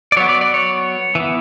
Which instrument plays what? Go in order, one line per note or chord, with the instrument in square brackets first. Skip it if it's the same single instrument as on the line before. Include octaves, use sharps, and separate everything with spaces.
[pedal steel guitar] D5
F#3 B3 C#5
D5
D5
C#5
E3
B3